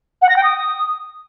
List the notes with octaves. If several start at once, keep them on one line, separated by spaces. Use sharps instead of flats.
F#5
A#6
G5
D#6